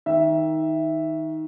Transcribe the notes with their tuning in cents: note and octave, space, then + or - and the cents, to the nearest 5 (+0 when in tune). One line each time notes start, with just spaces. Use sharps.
D#3 +20 E5 +0